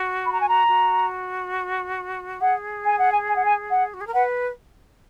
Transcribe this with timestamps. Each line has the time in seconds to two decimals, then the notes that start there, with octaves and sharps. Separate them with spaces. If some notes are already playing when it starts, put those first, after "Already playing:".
Already playing: F#4
0.26 B5
0.33 A#5
0.41 G#5
0.49 A#5
0.68 F#4
2.41 G#4 F#5
2.85 G#5
2.99 F#5
3.12 G#5
3.28 G#5
3.36 F#5
3.45 G#5
3.70 F#5
3.94 F#4
4.01 G#4
4.07 A#4
4.14 B4 F#5